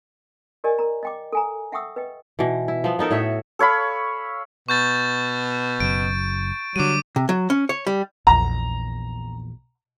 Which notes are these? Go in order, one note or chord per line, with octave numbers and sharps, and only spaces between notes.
G4 A#4 D5 D#5 G#5
A#4 A#5
D#5 G5 D6
A4 G#5 A#5
E5 F#5 G5 C#6 D#6 E6
B4 D#5 G5
B2 E3
E4
F3 B3
B3 D#4 A4 A#4
A2 F#4 C#5 E5
A4 C#5 F5 B5
B2 C#6 G6 A6
F#1 F#2 D7
D3 F#3 G3 D6 D#7
C3
F#3
C#4
C#5
G3
A#1 E2 A#5